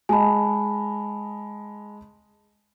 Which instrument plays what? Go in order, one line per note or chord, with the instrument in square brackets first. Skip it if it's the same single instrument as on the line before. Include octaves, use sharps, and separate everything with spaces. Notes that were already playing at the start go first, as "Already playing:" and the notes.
[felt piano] G#3 D#5 [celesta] G#5 A5 B5